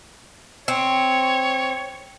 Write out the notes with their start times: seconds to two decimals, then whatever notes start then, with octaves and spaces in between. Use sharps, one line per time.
0.68 C4 C#5